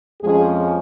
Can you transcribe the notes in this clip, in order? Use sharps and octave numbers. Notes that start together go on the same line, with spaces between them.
F2 F3 G#3 C#4 G#4